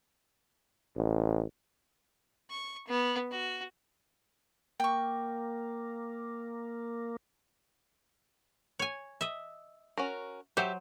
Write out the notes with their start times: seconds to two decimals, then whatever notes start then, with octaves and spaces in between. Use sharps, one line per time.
0.96 A1
2.50 C#6
2.88 B3
3.31 F#4
4.80 A#3 G5 C#6
8.79 C#5 G#5
9.21 D#5 E5
9.98 C#4 F#4 A#4
10.57 F#3 G4 C5 E5